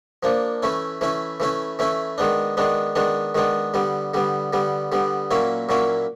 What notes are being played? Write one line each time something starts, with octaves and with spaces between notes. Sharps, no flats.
F3 A#3 D4
E3 A3 C#4 E4
E3 A3 C#4 E4
E3 A3 C#4 E4
E3 A3 C#4 E4
D#3 G#3 B3 D4
D#3 G#3 B3 D4
D#3 G#3 B3 D4
D#3 G#3 B3 D4
D3 G3 B3
D3 G3 B3
D3 G3 B3
D3 G3 B3
A#2 F#3 A#3 C#4 E4
A#2 F#3 A#3 C#4 E4